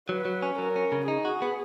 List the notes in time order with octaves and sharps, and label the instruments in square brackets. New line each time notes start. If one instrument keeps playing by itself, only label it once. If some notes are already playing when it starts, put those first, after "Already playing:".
[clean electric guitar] F#3 [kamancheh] B4
[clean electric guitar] F#3
C#4
[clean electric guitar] F#3 [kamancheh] A#4
[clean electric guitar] C#4
C#3
[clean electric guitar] D#4 [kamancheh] G#4
[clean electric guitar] F#4
B3